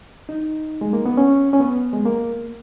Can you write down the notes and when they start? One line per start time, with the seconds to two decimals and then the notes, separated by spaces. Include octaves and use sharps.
0.29 D#4
0.81 G#3
0.93 A#3
1.05 B3
1.17 C#4
1.53 C#4
1.60 B3
1.93 G#3
2.06 A#3